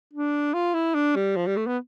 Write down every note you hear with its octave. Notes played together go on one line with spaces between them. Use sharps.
D4
F4
E4
D4
G3
F3
G3
A3
B3